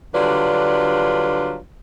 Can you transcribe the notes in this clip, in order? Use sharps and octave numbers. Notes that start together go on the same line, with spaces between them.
D3 F#3 G3 D4 F4 B4